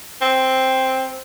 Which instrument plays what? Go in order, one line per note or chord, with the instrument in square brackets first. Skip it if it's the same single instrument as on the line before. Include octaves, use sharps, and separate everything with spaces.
[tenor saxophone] C4